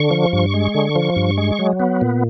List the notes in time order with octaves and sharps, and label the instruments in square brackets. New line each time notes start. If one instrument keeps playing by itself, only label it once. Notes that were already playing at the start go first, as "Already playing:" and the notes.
Already playing: [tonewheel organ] D3 C#6
F3
G2
G#3
D3
F3
G2
G#3
F#3
B3
A#2